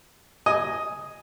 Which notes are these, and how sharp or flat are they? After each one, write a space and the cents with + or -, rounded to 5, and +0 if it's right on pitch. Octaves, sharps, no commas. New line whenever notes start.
D#5 +0 G#5 +0